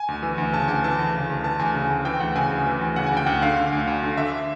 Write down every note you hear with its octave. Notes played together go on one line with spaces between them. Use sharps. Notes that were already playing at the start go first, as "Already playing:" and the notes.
Already playing: G#5
D2
E3
D2
C#3 A5
D2 G#5
E3 A5
D2
C#3
D2
E3 A5
D2 G#5
C#3
D2
E3 G5
D2 F#5
C#3 G#5
D2
E3
D2
C#3 F#5
D2 G#5
G5
D2 F#5
D3 F5
D3
D2
D2
D3
D3 E5